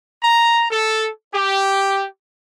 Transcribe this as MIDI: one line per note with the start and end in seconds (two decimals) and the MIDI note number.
0.22 0.66 82
0.71 1.09 69
1.33 2.06 67